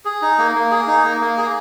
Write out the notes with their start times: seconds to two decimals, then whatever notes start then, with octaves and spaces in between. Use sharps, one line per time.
0.05 G#4
0.22 D#4
0.38 A#3
0.55 A#3
0.71 G#4
0.87 D#4
1.04 A#3
1.21 A#3
1.37 G#4